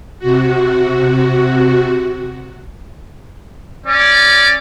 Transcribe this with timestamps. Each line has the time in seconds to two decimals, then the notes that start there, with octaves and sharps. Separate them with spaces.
0.19 C3 F#4
3.86 C#4 D5